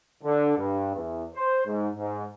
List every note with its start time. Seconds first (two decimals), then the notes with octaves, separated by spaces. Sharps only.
0.23 D3
0.57 G2
0.96 E2
1.34 C5
1.67 G#2
1.96 G#2